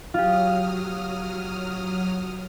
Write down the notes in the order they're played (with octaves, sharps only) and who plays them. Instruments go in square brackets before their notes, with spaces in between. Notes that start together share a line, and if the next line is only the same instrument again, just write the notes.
[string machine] F#3 D#6 F6 [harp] F4 G4